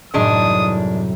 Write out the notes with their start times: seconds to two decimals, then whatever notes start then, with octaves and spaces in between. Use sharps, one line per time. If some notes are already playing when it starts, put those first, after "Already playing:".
0.14 C2 F#2 A2 D#3 G#3 D4 D#6